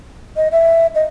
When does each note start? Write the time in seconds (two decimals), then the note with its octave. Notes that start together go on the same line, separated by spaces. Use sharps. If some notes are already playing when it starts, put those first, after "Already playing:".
0.36 D#5
0.52 E5
0.95 D#5